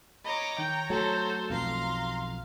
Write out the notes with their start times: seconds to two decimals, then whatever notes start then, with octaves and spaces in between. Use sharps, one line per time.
0.25 C#5 D#5 A#5 B5 D6
0.58 D#3 G5
0.90 F#3 A3 A4 C5
1.50 B1 F2 F5 A#5 C6